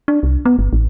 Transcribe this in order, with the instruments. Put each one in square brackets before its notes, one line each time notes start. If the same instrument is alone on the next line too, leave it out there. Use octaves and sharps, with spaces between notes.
[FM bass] D4
C2
B3
G1
A1